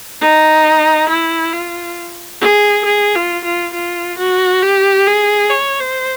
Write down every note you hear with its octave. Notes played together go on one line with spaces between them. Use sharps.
D#4
E4
F4
G#4
G#4
F4
F4
F4
F#4
G4
G#4
C#5
C5